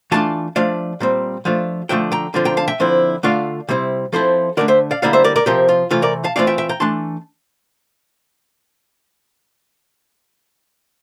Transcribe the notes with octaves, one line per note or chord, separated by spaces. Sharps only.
E3 A3 D4 F4 F5 A5
F3 A3 D4 D5 F5
A#2 G3 C4
F3 A3 D4 F4
D3 F3 A3 E5 G5
G5 A#5
D3 F3 C4 F4
G5 A#5
F5 A5
E5 G5
D3 F3 C4 E4
D3 A3 D4 F4 D5 F5
C3 G3 C4 E4
F3 C4 E4 A4 C5
D3 A3 D4 A#4 D5
C5 E5
D5 F5
D3 G3 A#3 E4 D5 F5
C5 E5
A#4 D5
A#4 D5
C3 F3 C4 G4 A#4
F4
C3 E3 A3 F4
A#4 D5
F5 A5
E3 A3 C4 F4 D5 F5
E5 G5
E5 G5
G5 A#5
E3 A3 D4 A5 C6